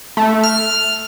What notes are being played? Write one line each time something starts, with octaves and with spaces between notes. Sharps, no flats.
A3
F6